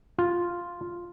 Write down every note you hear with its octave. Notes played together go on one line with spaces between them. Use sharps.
F4